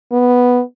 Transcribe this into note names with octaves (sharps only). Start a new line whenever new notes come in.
B3